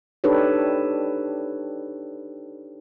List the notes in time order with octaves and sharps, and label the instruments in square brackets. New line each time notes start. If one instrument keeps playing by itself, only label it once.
[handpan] D4 D#4 G4 A4 B4 C#5